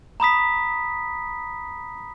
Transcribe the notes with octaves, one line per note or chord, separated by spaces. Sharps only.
A#5 B5 D#6 B6